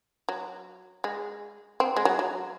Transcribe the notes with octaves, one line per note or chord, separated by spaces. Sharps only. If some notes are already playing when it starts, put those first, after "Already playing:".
F#3
G#3
C4
G#3
F#3
F#3